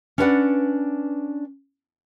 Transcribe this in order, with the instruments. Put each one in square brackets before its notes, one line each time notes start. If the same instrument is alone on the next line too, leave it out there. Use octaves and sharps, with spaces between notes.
[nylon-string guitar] C#4 D4 B4 C5 D5 F#5